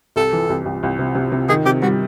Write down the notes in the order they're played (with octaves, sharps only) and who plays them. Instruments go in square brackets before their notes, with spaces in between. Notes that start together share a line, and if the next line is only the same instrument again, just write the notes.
[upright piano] C2 [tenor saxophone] A4
[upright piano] E3
C2
C2
C2
C3
C3
C3
[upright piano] D#3 [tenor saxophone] G#4
[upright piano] C3 [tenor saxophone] G4
[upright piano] G3 [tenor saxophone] F#4